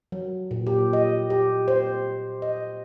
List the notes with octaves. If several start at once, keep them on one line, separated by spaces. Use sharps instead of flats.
F#3
A#2
G4
D#5
G4
C5
D#5